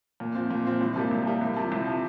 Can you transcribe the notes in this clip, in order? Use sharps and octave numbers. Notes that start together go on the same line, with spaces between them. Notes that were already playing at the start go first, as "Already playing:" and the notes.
A#2
F3 C4
A#2
F3 C4
C2
C3 G3 A#3
C2
C3 G3 A#3
C2
C3 F3
C2
C3 F3